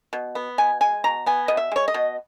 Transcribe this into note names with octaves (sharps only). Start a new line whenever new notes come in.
B2
B3
B2 G#5
G#3 G#5
B2 A#5
B3 G#5
B2 D#5
E5
G#3 C#5
D#5
B2